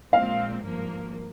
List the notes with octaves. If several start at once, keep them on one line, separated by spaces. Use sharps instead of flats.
A#1 A#2 G#3 C4 F5
G#1 G2 F3 A#3